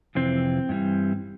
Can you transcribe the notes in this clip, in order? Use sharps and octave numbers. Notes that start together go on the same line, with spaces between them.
F2 C3 E3 C4
G2 E3 G3